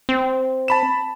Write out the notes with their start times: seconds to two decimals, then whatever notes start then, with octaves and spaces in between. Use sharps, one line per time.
0.09 C4
0.68 A5 B5 E7